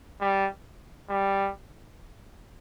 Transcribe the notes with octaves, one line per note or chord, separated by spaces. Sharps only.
G3
G3